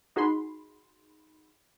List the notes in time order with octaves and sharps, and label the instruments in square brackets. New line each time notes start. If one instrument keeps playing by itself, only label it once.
[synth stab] D#4 F#4 G#4 B5 C6